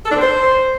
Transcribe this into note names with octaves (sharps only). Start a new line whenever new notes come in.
A4
D4
C4
C5